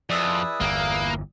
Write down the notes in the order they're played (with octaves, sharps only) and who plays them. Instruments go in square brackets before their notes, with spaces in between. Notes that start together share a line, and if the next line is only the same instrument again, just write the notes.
[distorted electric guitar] F2 [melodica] E4 G#4 B4 [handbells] D5 D#6 E6
[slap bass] G1 E2 [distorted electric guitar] A#3